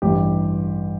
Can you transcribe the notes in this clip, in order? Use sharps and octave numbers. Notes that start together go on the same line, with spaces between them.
A1 G2 E3 G4